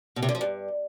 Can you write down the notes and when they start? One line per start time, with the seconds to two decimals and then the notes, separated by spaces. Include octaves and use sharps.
0.16 B2
0.22 C3
0.29 D3
0.35 F3
0.41 G2